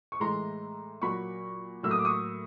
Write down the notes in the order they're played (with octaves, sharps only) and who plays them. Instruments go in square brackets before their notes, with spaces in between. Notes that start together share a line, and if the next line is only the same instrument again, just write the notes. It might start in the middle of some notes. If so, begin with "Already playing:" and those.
[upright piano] C#6
A2 E3 G#3 A#5 C6
A#2 F#3 A#3 B5 C#6
A2 F#3 A#3 E6
D#6
D6
C#6 D#6